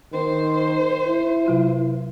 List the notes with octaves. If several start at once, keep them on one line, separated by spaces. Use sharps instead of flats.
D#3 C5
E4
C3 F#3 F4